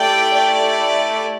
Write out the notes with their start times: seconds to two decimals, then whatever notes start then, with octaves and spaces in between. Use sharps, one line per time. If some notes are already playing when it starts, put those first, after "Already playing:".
Already playing: A3 E4 G4 D5 G5
0.33 D5